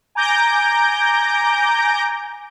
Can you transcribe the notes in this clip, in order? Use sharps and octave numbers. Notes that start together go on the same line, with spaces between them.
G#5 A#5 D6 G6 A#6 D7